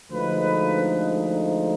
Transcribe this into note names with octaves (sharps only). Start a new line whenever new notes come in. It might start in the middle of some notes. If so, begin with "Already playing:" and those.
D2 D3 F3 G#3 D#4 B4